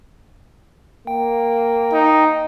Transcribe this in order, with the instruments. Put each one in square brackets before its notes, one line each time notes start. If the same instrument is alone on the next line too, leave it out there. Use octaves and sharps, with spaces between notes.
[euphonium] A#3 [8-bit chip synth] G5
[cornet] D#4